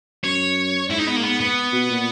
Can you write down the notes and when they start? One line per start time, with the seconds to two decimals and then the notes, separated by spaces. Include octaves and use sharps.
0.24 F#2 C#5
0.90 G#2 E4
0.99 D#4
1.07 B3
1.16 A#3
1.24 B3
1.40 B3
1.73 B2
1.90 A#2